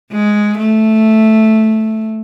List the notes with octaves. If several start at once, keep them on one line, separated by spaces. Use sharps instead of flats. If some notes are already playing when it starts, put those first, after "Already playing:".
G#3
A3